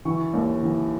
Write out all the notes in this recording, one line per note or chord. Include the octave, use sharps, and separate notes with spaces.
E3 C#6
D#2
E3